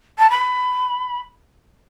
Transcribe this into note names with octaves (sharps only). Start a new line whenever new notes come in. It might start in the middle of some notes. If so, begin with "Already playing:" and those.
A5
B5